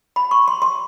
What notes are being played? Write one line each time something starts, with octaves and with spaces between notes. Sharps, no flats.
B5
C#6
C6
C6